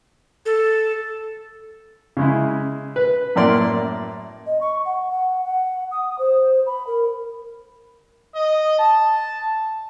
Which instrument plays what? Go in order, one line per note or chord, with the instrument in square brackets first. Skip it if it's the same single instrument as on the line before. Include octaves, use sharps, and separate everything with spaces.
[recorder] A4
[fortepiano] C#3 G#3 E4
B4
F#2 A2 A#3 D5 C6
[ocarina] D#5
C#6
F#5
F#5
F#5
D#6
C5
B5
A#4
[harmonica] D#5
A5